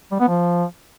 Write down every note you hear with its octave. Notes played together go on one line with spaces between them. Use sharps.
G3
B3
F3